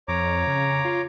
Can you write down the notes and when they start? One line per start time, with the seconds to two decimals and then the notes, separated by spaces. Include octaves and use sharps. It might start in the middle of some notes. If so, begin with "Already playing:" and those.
0.08 F2 C#5 A#5 D6
0.47 C#3
0.85 F4